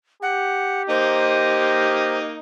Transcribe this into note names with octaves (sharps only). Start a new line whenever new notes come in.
G4 F#5
A#3 D#4 C5 D#5